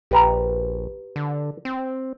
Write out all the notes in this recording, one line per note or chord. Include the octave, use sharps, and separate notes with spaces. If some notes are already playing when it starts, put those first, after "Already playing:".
A#1 G4 B4 A#5
D3
C4